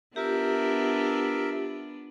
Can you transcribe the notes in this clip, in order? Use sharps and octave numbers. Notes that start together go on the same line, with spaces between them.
B3 D4 F4 G4 A#4 E5